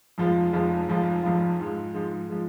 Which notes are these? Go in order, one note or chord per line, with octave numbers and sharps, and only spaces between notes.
F1 F2 F3 G#3 F4
F1 F2 F3 G#3 F4
F1 F2 F3 G#3 F4
F1 F2 F3 G#3 F4
G#2 F3 G#3
G#2 F3 G#3
F3 G#3